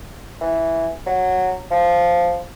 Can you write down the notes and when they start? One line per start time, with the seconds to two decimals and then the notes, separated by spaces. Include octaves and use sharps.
0.41 E3
1.07 F#3
1.71 F3